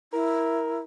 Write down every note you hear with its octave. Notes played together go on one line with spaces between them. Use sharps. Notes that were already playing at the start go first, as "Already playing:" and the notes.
E4 A#4